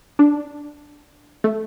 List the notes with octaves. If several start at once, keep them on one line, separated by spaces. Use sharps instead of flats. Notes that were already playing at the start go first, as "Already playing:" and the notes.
D4
A3